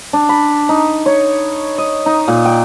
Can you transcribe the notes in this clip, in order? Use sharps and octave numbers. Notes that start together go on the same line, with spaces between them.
D4
B5
D#4
C#5
D#5
D#4
A#2
G5